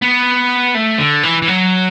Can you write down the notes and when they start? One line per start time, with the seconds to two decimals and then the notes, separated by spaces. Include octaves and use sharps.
0.02 B3
0.75 A3
0.99 D3
1.23 E3
1.42 E3
1.48 F#3